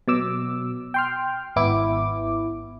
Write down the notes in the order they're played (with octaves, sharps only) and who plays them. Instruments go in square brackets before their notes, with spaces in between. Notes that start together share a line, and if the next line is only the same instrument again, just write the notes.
[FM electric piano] B2 F#3 D6 E6
G5 C6 F6
G#1 B3 E4 D6